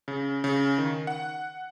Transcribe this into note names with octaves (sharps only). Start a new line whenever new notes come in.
C#3
C#3
D#3
F#5